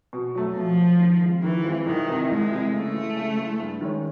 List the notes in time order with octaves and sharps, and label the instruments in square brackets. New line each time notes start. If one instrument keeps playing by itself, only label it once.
[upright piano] B2
F#3 A3
[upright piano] B2 [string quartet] F3
[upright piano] F#3 A3
D#3
G#3 C4 F4
[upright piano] D#3 [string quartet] E3
[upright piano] G#3 C4 F4
[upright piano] C2 [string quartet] D#3
[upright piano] C3 E3
[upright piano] C2 [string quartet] G#3
[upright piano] C3 E3
[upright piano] C#3 [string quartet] A3
[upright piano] E3 G#3
C#3
E3 G#3
G2
D#3 G#3 C#4